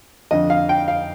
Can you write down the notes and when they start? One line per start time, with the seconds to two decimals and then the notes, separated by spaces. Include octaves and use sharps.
0.31 F2 D3 D#5
0.50 F5
0.69 G5
0.88 F5